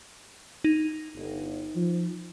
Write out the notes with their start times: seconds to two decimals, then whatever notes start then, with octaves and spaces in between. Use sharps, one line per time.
0.64 D#4
1.15 G1
1.75 F3